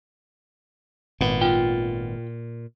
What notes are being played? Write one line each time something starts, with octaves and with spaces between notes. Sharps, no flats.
G#1 A#2 B3
F4 G5